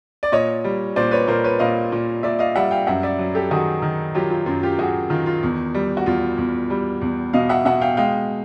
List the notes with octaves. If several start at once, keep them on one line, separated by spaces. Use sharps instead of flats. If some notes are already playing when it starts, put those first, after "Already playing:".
D5
A#2 C#5 D#5
G3
A#2 C5 D5
B4 C#5
A#2 A#4 C5
B4 C#5
A#2 D#5 F5
A#2
A#2 D5 E5
D#5 F5
G3 E5 F#5
F5 G5
F#2 E5 F#5
D5 E5
F#3
G4 A4
D#3 F#4 G#4
D#3
F#3 F4 G4
F4
F#2 F4
F4 G4
F#2 F#4 G#4
D#3 F4
F4
E2
G3
F#4
E2 F4
E2
G3
E2
B2 D#5 F5
E5 F#5
B2 E5 F#5
F5 G5
G#3 F5 G5